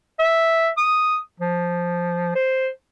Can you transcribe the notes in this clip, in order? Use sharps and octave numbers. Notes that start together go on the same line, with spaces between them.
E5
D#6
F3
C5